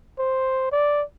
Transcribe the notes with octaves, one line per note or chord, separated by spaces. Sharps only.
C5
D5